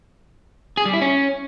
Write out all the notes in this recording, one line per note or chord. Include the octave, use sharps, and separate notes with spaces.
G#4
G3
E4
C#4